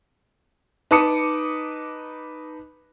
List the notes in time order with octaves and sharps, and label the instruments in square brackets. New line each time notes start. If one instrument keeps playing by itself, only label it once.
[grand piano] D#4 B4 A5 D6 D#6 C#7